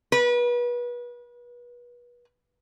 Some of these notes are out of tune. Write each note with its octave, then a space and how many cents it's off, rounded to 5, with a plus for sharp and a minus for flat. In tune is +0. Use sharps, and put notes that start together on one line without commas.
B4 -30